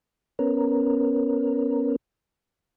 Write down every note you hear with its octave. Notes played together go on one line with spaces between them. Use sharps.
B3 C#4 A#4